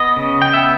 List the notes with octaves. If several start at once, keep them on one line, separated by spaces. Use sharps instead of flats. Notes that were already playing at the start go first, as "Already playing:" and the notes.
Already playing: B3 D#5
C#3
G5
B3 E5